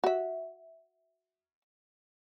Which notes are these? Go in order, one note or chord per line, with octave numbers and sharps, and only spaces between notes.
F#4 E5